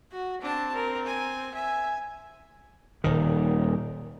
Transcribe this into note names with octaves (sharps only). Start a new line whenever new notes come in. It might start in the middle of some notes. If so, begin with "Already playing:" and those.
F#4
C4 D4 A5
A#4
G#5
E5 G#5
D#1 D#3